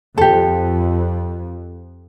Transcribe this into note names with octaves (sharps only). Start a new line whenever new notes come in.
F2 G4 A4